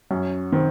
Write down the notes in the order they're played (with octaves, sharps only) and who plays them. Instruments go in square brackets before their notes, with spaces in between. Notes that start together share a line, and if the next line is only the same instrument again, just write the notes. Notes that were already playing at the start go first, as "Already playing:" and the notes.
[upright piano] F#2 C#4
D#3 C4